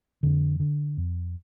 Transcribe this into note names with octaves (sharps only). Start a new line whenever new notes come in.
F2 D3
D3
F2